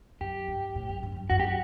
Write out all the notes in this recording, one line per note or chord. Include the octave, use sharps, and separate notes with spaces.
F#2 G4
G2
A2
F#2
G2
F#2
G2
F#2 F#4
G4
F#4